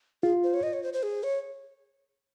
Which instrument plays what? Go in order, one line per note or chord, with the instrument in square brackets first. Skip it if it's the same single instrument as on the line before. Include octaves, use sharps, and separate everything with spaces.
[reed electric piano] F4 [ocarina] G#4
[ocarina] C5
C#5
D#5
C#5
C5
C5
G#4
C#5